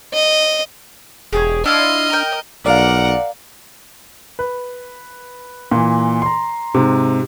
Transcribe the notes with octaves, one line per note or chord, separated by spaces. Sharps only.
D#5
E1 G4 G#4 C#5
D4 E4 F4 D#5 F5 F6
A#4 G5
B1 A#4 D5 F5 F#5
B4
A#2 E3
A#5 C6
G#2 C3